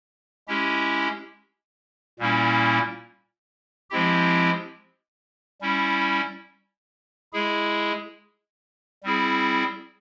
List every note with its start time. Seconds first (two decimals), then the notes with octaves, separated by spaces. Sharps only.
0.48 G#3 C#4 E4 G4
2.19 A#2 G3 A#3 C#4 E4
3.90 F3 G#3 C4 E4 G4
5.61 G3 C#4 E4
7.33 G#3 E4 G#4
9.03 G3 C4 E4 G#4